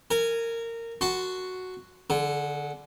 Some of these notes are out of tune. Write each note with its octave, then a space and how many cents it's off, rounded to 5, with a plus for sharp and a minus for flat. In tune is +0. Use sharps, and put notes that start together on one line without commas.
A#4 -20 G#5 +0
F#4 +0 A5 +0 C6 -15
D3 +0 G#4 +45